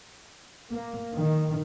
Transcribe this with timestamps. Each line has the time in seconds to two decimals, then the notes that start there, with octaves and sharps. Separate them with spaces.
0.72 A#3
1.14 D#3